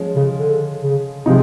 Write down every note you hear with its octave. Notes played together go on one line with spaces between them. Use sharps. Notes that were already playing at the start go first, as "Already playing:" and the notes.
Already playing: F3 G#3 C#4
C#3
D3
C#3
C3 F3 G#3 C4 D#4